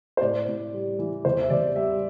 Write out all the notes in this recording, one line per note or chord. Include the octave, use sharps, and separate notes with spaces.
C5
A2 D5
A2
G3
E3
E2 C5
E5
E2 D5
G3 E5